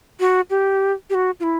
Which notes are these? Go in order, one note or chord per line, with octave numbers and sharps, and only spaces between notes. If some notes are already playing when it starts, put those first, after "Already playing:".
F#4
G4
G4
F#4
F4
E4